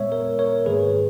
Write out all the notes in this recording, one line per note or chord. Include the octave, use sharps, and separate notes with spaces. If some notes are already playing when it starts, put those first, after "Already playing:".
Already playing: A#2 G#3 B3 C#5 E5
A#4 C#5
A#4 C#5
G#2 D#3 A#3 G#4 B4